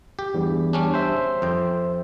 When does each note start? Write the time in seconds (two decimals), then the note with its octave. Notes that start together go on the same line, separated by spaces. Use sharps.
0.19 G4
0.34 E2 G2
0.73 G3 C#4 D4
0.94 C5 E5
1.42 F2 G5